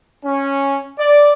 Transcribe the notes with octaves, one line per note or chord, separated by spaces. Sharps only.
C#4
D5